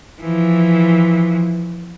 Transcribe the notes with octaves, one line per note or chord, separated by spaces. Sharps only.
E3 F3